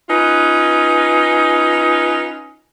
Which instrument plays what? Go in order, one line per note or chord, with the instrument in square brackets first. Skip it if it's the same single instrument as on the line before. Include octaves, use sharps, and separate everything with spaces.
[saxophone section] C#4 D#4 F4 B4